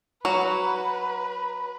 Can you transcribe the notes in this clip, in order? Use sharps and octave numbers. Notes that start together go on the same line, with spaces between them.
F#3 F#4 B4 A#5